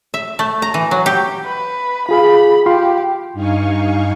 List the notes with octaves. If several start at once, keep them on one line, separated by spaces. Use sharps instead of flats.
E5
A3
A#5
E3
F#3
G4
B4
F4 G#4 F5 B5
F4 G4 F5 C6
G2 D#4 F5 G#5 C#6